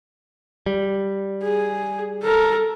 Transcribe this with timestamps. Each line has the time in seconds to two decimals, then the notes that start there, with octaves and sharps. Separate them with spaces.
0.66 G3
1.43 G#4
2.23 A4 A#4